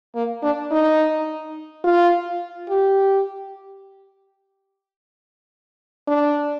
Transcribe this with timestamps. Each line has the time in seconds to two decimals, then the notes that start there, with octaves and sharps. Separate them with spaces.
0.16 A#3
0.43 D4
0.72 D#4
1.84 F4
2.69 G4
6.08 D4